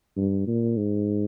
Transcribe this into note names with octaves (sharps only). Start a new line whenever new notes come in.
G2
A#2
G#2